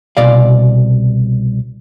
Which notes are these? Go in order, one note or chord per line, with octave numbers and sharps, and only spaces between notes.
C2 B2 D5 F5